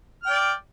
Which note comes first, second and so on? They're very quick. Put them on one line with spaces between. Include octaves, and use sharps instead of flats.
F6 G5 D5